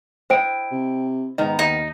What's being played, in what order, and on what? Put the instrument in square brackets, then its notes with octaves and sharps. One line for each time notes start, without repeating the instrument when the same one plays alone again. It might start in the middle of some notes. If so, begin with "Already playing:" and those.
[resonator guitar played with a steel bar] E4 D#5 [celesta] C5 G5 D7
[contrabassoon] C3
[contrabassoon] G#2 [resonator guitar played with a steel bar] D#3 B3 A#5 [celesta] D#5
[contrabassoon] D#2 [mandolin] D#4